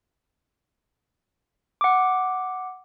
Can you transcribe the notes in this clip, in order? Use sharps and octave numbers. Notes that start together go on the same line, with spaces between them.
F#5 D6